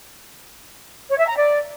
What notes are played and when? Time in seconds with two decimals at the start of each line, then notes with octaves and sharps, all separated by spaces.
1.10 C#5
1.19 E5
1.28 A#5
1.37 D5